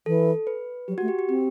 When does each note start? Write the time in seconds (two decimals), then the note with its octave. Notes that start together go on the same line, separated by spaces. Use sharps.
0.06 E3 A4
0.47 B4
0.88 F#3 G4
0.98 A3 F#4
1.08 G4
1.19 G4
1.29 C4 G4